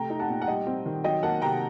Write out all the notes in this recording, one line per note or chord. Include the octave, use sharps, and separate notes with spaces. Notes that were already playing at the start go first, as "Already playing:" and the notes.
Already playing: C3 A3 G5 A#5
D#4
F#5 A5
A#2
F#5
G3 D#5 G5
C4
D#3
F#3 D#5 G5
A#3 F#5 A5
C3 G5 A#5